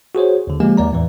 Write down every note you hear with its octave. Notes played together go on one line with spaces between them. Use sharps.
F#4 G#4 C5 C#5
D#2 D3
F3 G#3 A#3 G4 G#5
D#2 D5 A#5
E2 A2 E3